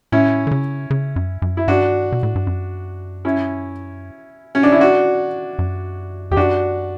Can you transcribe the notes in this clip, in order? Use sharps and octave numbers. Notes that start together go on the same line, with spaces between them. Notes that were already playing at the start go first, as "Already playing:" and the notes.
A2 C#4 E4
D3
C#3
C#3
F#2
F#2
E4
G2 D4 F#4
B2
A2
G2
F#2
C#4 E4
C#4
D4
E4
D4 F#4
F#2
E2 G4
F#2 D4 F#4